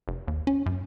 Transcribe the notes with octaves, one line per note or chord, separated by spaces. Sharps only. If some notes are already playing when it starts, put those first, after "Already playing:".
F1
D#2
C#4
F#2